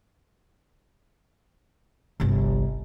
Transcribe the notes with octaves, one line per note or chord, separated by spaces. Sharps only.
G1 C2